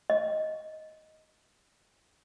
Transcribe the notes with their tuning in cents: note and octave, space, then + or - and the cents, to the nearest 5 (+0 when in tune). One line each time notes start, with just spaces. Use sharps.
D#5 +5